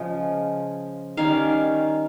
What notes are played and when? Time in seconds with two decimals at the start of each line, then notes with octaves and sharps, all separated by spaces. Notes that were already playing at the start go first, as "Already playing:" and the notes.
Already playing: C#3 F3 G#3
1.17 D#3 G3 C#4 F5